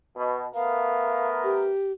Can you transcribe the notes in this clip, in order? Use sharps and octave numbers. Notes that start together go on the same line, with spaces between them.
B2
A3 B3 A#4 F5
G4